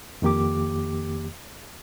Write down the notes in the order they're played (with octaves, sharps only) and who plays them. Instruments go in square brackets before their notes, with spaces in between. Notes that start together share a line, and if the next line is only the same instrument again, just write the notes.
[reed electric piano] F2 D#3 A#3 G4 D6